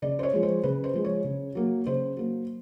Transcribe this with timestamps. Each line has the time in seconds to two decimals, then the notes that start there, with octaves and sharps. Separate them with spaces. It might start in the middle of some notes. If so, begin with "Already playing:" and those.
0.02 C#3 D5
0.19 C5
0.23 C#5
0.33 F3 G#3
0.43 C5
0.64 C#3 B4
0.84 C5
0.94 F3 G#3
1.05 C#5
1.24 C#3
1.55 F#3 A#3
1.86 C#3 C5
2.17 F#3 A#3